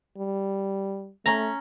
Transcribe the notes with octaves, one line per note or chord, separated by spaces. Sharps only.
G3
A3 C#4 A#5